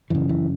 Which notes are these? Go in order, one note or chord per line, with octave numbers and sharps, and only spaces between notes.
F#2 C#3 E3
E3